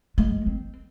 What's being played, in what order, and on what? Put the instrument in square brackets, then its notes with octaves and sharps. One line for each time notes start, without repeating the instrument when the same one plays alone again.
[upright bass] G#3
C4